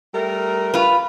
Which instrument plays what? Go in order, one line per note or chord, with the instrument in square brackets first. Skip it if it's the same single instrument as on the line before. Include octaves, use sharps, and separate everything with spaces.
[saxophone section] G3 A3 A#4
[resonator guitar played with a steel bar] F4 B4